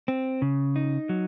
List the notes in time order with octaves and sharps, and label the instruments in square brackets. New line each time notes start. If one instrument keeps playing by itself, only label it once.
[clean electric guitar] C4
C#3
D#4
F#3